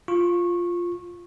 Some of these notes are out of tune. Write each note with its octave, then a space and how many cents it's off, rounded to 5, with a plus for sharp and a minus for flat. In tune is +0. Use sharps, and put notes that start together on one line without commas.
F4 +0 C#6 -20